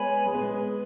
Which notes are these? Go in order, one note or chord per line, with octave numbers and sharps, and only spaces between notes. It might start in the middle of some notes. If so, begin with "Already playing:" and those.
Already playing: G#3 B3 C#5 G#5 B5
G#3 G#4
B3
G#3